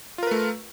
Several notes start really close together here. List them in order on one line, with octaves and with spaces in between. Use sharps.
F4 A#4 B4 A3